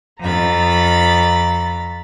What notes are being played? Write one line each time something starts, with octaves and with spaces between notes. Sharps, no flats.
F2 A#5 B5 A6